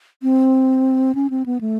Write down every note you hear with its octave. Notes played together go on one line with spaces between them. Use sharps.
C4
C#4
C4
B3
A3